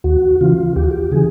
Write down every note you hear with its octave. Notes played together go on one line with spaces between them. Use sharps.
D#2 F#4
C#3 E3 F4
D#2 G4
F#4
G4
C#3 E3 G#4